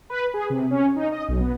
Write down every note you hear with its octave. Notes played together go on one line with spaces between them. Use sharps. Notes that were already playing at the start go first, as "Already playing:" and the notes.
B4
G#4
C3
C#4
D#4
D#5
B1
B3